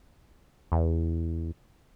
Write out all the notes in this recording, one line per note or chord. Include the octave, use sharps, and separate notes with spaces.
E2